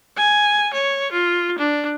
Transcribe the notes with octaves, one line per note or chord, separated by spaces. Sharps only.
G#5
C#5
F4
D4